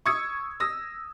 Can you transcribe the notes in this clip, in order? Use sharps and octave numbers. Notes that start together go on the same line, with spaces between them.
C#6 D#6 E6 G#6 C#7
D#6 E6 A#6